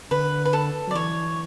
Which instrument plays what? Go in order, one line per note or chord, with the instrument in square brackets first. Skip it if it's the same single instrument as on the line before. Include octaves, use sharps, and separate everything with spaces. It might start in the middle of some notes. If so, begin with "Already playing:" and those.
[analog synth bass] D3 [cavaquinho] B4
[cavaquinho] B4
A4
[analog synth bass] F#3 [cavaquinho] D5
[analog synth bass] E3 [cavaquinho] C#5